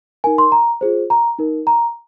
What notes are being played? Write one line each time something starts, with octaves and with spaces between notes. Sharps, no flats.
D#4 A#4 G#5
C6
A#5
F4 G#4 C5
A#5
D#4 A#4
A#5